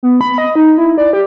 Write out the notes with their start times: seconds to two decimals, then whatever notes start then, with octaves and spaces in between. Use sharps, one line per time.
0.03 B3
0.21 B5
0.38 D#5
0.55 D#4
0.78 E4
0.98 D5
1.13 G4